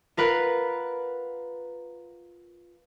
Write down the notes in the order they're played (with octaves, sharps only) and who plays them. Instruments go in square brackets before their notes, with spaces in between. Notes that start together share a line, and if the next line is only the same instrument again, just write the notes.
[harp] F4 A#4 B4 F#5